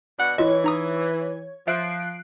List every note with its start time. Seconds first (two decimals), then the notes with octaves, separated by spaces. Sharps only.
0.19 B2 D4 F#5
0.38 E3 E4 F4 C#5 D#5
0.64 D#4 A#5 D#6
1.68 F3 E5 F#6 C7 D7